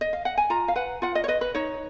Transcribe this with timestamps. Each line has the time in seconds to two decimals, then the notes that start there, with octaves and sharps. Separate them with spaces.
0.01 D#5
0.13 F5
0.25 F#5
0.38 G#5
0.50 F4 A#5
0.68 F5
0.76 B4 F#5
1.02 F4 F#5
1.15 D#5
1.24 C#5
1.28 B4 D#5
1.41 B4
1.55 D#4 C#5